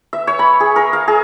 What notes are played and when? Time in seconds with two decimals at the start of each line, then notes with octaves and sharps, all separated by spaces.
0.13 E5
0.27 C#5
0.39 B5
0.60 G#4
0.76 A#4
0.93 F5
1.08 G#4